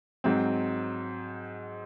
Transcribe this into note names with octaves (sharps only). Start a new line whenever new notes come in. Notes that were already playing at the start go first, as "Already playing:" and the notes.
G#2 F#3 C4